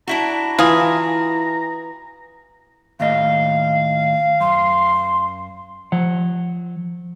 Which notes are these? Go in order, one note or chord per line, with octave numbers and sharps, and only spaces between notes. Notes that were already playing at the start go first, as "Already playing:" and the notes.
D4 E4 F#4 A#5
E3 F4 G#4
D#2 A2 D#5 F5
F#2 C6
F3 F#5